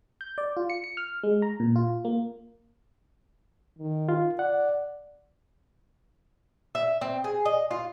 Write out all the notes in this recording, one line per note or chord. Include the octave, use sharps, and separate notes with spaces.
G6
D5
F4
C#7
C#7
F6
G#3
A#5
A#2
F4
A#3
D#3
F4
D5 F#5
E5
C4
G#4
D#5
F4